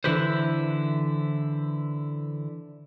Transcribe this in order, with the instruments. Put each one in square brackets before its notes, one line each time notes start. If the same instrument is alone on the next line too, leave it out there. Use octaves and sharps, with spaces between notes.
[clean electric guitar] D3 E3 E4 G4 B4 C5